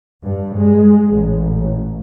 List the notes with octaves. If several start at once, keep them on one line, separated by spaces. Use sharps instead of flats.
G2
G#3
A1